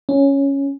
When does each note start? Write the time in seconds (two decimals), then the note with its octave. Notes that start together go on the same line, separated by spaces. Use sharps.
0.09 C#4